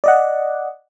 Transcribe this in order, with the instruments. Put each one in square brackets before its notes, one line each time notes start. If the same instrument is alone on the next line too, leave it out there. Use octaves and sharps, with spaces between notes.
[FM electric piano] D5 D#5 F#5